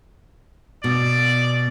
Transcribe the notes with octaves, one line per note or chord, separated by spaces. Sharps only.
B2 D5